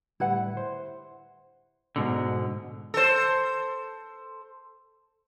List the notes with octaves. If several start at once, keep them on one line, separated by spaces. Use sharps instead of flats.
A2 D3 G3 E4 B4 F#5
C5
G#2 B2 D3
A4 C5